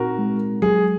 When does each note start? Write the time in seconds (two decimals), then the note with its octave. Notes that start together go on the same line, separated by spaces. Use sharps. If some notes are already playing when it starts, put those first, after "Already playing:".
Already playing: A#2 C4 D#4 F#4 A#4
0.18 G#3
0.62 F#3 G#4